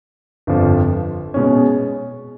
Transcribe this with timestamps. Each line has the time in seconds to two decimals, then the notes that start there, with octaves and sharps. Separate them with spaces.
0.47 G1 F2 D3 F3
1.34 B2 G#3 C#4